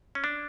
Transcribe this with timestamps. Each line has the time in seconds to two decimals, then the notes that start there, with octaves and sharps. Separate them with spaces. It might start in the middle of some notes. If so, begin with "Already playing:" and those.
0.15 C#4
0.24 D4